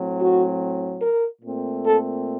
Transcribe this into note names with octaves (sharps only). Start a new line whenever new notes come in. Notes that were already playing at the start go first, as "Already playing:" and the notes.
Already playing: A2 F#3 C4
F#4
A#4
A#2 A3 C4
A4